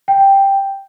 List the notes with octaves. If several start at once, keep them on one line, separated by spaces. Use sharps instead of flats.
G5